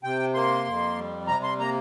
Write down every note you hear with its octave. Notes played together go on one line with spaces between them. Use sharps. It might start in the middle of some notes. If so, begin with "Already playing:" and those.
C3 G5
A#3 C6
F2
G3
C3 A#5
C6
A#3 A#5